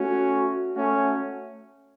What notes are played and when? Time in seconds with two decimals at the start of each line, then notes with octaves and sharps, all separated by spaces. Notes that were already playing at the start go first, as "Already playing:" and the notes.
Already playing: A3 C#4 F#4
0.76 A3 C#4 F#4